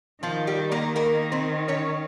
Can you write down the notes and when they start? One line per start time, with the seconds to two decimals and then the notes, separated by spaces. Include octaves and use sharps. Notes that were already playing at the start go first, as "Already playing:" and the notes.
0.23 D#3 F3 F4
0.47 G3 G4
0.72 A#3 A#4
0.96 A#3 A#4
1.32 C4 C5
1.68 C#4 C#5